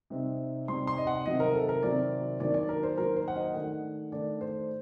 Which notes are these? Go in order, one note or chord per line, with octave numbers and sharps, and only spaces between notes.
C3 G3 C4 D#4
C3 G3 C4 D#4 C6
C6
D#5
F#5
C3 D#3 F#3 C4 D#5
A#4
A4
A#4
C3 D#3 F#3 C4 D5
D#3 F#3 A#3 D4 D5
D5
A#4
C5
D#3 F#3 A#3 D4 A#4
C5
F#5
D#5
D#3 A3 D4 F#5
D#3 A3 D4 D5
C5